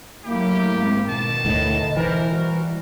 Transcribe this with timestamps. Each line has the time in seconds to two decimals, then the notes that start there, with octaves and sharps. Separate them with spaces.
0.24 F#3 A3 A#3 E4 G4
0.78 G#2 C4
1.08 B2 D#3 A5
1.45 D2 A2 D#5
1.97 E3 A#4 C5
2.31 G3 F#4